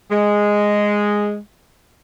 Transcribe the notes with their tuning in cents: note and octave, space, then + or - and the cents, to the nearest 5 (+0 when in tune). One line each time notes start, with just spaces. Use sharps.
G#3 -5